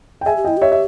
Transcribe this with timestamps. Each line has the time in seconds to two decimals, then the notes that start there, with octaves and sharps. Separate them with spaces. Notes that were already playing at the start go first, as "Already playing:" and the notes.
0.21 G5
0.25 G#4 E5 G#5
0.37 G4
0.44 E4 D#5 G5
0.57 G4 C#5 E5
0.72 E5